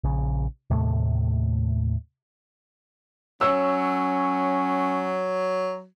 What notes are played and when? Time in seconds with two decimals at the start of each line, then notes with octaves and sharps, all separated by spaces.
0.04 A#1 C#3
0.70 D#2 A2 C3 A3
3.41 F#3 C#4 C#5 E6